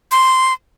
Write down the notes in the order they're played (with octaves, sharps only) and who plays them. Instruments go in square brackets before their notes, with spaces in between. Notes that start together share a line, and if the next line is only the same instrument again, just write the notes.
[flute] C6